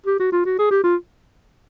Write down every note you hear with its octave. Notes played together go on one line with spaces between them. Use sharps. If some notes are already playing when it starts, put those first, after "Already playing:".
G4
F#4
F4
F#4
G#4
G4
F4